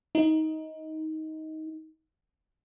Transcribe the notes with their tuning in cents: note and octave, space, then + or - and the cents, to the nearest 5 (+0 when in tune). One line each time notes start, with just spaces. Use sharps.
D#4 +15